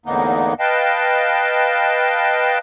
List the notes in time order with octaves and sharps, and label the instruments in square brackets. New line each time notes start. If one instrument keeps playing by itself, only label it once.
[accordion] E2 A2 D3 A#3 B3 D#4
B4 D#5 F5 G5 A5